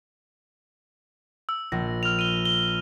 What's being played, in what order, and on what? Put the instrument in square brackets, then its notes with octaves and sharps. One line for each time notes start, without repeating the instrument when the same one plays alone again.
[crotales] E6
[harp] A#1 [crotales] A#6
[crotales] F6 F7
D#7 G7
G7